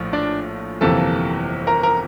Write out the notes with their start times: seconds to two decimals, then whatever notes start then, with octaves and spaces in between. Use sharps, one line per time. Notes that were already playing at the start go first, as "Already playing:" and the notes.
Already playing: A#1 A2 F3
0.13 D4 D5
0.81 G1 F2 C3 E3 A#3 A4 A5
1.67 A#4 A#5
1.83 A#4 A#5